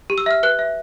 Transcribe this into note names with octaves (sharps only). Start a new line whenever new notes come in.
G4
E6
E5 F6
B4 F#6
E5